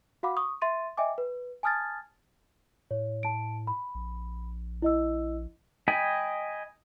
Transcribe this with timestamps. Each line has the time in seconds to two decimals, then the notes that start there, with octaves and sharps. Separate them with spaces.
0.23 F#4 F5 F#5 B5 D6
0.37 C#6 D#6
0.62 E5 C6 A6 D#7
0.97 D#5 E5 G5 G#5 D6
1.18 B4
1.63 G#5 A5 D#6 F6 G#6 A6
2.91 A2 C#5
3.23 A5 D7
3.67 B5
3.95 A#1
4.82 E4 D#5 E6
5.88 D#5 G5 G#5 B5